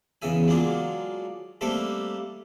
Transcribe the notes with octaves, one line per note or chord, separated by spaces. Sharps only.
E2 C#3 E5 G#5
F#3 G#3 A#3 D4 F4
G3 A3 A#3 C4 A4